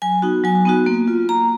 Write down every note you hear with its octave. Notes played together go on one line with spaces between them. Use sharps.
F#3 G#5
B3 D#4 F#4
F#3 G#5
B3 D#4 F#4
A#3
F4
A#3 A#5